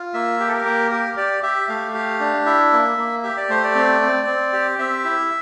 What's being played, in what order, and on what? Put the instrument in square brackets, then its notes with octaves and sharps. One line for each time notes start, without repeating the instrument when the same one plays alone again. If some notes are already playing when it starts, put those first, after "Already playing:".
Already playing: [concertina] F4
A#3 E5
G4
A4
A#4
A#3
G4 A#4
G4 D5
G4 E5
A3 F5
G4
D4
E4 E5
A#3
A#3
G4 E5
D5
A3 C5
D5
C4
C4
C4
G4
C4 E5
E4